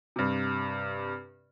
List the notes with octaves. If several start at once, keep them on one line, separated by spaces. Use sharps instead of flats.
G2 C3